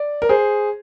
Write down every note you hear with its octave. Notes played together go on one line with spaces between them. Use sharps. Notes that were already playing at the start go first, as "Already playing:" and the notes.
Already playing: D5
A#4
G#4 C5